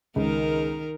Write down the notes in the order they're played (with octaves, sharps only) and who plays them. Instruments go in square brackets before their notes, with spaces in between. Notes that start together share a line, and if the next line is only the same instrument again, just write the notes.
[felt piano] C#2 [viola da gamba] D#3 A#4